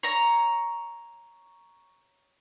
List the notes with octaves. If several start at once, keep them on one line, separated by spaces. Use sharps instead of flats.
C#5 A#5